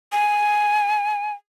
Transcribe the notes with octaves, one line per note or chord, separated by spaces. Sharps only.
G#5